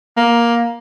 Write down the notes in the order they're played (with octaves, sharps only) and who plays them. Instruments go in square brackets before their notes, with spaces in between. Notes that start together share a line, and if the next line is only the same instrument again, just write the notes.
[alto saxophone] A#3